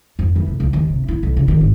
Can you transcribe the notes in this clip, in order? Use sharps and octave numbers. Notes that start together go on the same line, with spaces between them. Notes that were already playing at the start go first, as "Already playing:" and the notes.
F2
E3
F1
C#2
D#2
C3
E4
B1
C#3
D#3
G#1